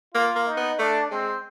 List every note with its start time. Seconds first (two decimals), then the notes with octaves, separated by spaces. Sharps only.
0.14 A#3 F4
0.36 A#3
0.47 D#4
0.57 B3
0.78 A3 D4
1.11 G#3 C4